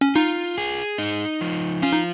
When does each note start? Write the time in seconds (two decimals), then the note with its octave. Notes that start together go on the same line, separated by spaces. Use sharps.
0.01 C#4
0.15 D#4 F4
0.58 G#4
0.98 D#4
1.41 F3
1.82 C#4 F4
1.93 D#4